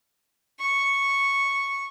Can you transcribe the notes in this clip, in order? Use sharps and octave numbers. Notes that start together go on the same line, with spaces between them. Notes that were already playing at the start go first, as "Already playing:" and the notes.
C#6